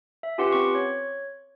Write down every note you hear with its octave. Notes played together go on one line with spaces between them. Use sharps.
E5
C#4 F4 G4 B4 F#5 C6
C4 C#6
C#5